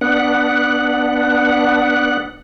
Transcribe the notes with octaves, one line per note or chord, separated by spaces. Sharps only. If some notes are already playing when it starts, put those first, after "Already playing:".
B3 D4 F#5